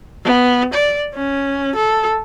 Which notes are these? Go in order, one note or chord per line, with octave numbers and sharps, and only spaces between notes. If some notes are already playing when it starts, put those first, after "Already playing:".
B3
D5
C#4
A4